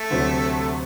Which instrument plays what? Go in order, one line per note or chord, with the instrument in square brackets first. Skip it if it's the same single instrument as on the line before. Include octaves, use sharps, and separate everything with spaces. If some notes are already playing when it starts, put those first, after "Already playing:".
Already playing: [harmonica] A3
[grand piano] D2 C3 F#3